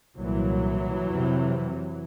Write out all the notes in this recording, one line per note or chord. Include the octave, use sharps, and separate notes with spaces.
C2 A#2 E3 F#3
F2 C3